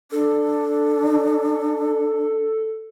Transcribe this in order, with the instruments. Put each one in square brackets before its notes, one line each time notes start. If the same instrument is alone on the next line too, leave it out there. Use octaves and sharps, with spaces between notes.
[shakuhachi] D4 [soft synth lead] A4